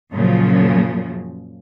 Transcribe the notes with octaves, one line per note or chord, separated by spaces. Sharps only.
F#2 A#2 C#3 F3